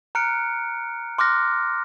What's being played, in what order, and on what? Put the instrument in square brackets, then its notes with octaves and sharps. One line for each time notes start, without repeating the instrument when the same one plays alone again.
[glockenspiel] A#5 F6 F#6 C#7 D7
C6 D6 F6 F#6 A#6